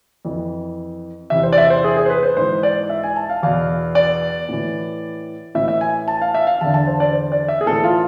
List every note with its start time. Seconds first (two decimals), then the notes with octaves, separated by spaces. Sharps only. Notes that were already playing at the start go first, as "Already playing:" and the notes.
0.25 F2 E3
1.30 E2 C3 E3 E5
1.43 C5
1.53 D5
1.58 E5
1.70 C5
1.84 G#4
1.97 G#4
2.06 C5
2.10 B4
2.23 C5
2.37 G#2 E3 C5
2.63 D5
2.90 E5
3.04 G#5
3.16 A5
3.29 F5
3.43 E2 B2 F5
3.95 D5
4.49 A2 E3
5.55 A2 E3 E5
5.68 E5
5.81 G#5
6.08 A5
6.21 F5
6.34 E5
6.47 F5
6.61 E2 D3 A5
6.74 A5
6.87 C5
7.00 D5
7.13 C5
7.32 D5
7.48 E5
7.61 G#4
7.66 A2 E3 A4
7.84 F4